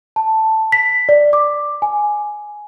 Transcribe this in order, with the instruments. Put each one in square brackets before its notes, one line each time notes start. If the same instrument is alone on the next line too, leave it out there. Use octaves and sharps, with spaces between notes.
[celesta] A5
B6
D5
D6
G#5